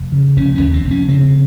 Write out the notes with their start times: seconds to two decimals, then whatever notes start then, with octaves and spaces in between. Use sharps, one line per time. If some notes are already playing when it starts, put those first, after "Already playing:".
Already playing: F1
0.12 C#3
0.37 F1 C#4
0.55 C#4
0.61 D#2
0.73 C4
0.85 F1
0.91 C#4
1.08 C#3 C4